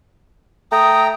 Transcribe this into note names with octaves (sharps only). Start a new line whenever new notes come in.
A3 G5 A#5 D#6